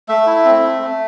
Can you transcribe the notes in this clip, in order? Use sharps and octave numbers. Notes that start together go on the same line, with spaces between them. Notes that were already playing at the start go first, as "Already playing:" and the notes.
A3 E5
E4
C4
A3
A3